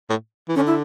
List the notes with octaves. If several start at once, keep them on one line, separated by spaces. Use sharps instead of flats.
A2
E3
D3 C#4
E4